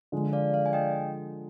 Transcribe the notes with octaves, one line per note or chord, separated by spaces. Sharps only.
D3 F3 G#3
D5 F5
D5 F5
G#5
D#5 G5